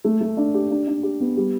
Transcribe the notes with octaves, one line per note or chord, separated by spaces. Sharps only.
A3
A3
D4
G4
D4
D4
G4
B3
G3